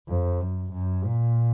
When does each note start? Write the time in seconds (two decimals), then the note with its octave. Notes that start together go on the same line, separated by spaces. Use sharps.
0.09 F2
0.41 F#2
0.73 F#2
1.05 A#2